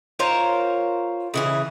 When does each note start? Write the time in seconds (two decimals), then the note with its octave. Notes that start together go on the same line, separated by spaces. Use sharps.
0.19 F4 A#4 C5 C#5
1.34 C#3 E3 G#4